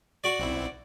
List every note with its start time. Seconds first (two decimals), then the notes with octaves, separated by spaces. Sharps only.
0.24 F#4 D5
0.39 B1 C4 E4